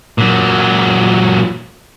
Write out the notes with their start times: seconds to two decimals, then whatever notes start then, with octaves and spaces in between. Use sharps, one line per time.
0.18 A#2 F#3